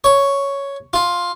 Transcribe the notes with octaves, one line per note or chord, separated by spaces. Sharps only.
C#5
F4